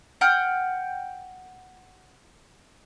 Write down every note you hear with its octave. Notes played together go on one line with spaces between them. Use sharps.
F#5 G5 F6